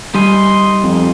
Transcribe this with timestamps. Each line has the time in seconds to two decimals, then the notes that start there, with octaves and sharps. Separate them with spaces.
0.15 G3 D#4 G#5 C6
0.83 F2